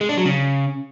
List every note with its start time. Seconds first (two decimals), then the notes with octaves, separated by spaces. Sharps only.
0.01 G#3
0.09 D4
0.17 F#3
0.25 C#3